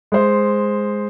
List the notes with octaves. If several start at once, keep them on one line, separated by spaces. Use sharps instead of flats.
G#3 C5